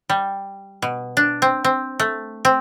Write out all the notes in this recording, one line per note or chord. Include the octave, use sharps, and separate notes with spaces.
G3
B2
D4
C4
C4
A3
C4